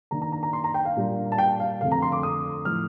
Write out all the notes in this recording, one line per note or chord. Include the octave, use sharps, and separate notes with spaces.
D#3 A#3 D4 A#5
A#5
A#5
A#5
C6
A#5
G5
F5
A#2 G3 A#3 D4
A5
G5
F5
F2 D3 A3 F5
A#5
C6
D6
D#6
A2 F3 A3 F6